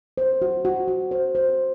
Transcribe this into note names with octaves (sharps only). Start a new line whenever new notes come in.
C5
F#4
F#4
F#4
C5
C5